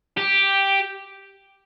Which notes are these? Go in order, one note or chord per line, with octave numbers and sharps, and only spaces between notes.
G4